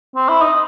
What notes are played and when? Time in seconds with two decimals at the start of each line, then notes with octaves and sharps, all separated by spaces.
0.16 C4
0.29 E4
0.42 D#4